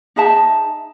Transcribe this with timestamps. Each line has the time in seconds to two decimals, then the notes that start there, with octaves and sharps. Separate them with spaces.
0.16 D#4 G#4 E5 A5